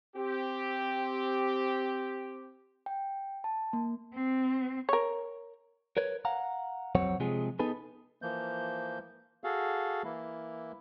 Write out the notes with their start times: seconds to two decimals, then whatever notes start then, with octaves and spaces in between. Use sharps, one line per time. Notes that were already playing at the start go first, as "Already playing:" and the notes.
0.16 C4 G4
2.86 G5
3.44 A5
3.73 A#3
4.14 C4
4.89 A#4 C#5
5.97 A#4 B4 C#5
6.25 F5 F#5 A#5
6.95 B1 F2 F#3 C4 C#5 F#5
7.20 C3 F3 G#3 G#4
7.59 B3 D#4 G#4 A4 B4
8.22 E3 F3 A#3 G6
9.44 F#4 G#4 A4 F5
10.04 E3 A#3 E4